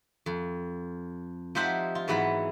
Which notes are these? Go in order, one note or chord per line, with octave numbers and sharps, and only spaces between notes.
F2
F3 D#4 G4 C5 E5 F#5
F4
G#2 E3 F#3 B3 B4 F#5